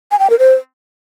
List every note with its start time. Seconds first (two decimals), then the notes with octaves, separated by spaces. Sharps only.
0.11 G#5
0.19 G5
0.30 A#4
0.39 C5